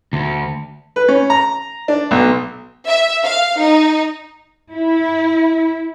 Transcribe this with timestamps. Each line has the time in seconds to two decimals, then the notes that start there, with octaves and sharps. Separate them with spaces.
0.13 D2
0.96 B4
1.08 C#4
1.30 A#5
1.88 D4
2.11 B1
2.87 E5
3.24 F5
3.58 D#4
4.74 E4